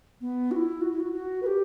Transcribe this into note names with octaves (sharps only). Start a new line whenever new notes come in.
B3
F#4
E4
F#4
E4
F#4
F#4
B4
G4